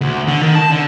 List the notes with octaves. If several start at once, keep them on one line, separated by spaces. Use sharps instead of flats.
D2
D3
D#3
A5
D3